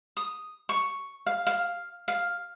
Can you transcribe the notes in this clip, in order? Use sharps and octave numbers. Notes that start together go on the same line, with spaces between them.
D#6
C#6
F5
F5
F5